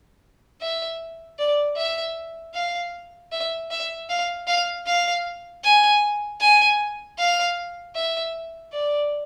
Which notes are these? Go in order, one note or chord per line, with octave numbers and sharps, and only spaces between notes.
E5
D5
E5
F5
E5
E5
F5
F5
F5
G#5
G#5
F5
E5
D5